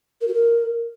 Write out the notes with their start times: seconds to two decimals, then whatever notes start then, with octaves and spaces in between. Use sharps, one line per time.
0.21 A#4
0.27 F#4
0.34 A#4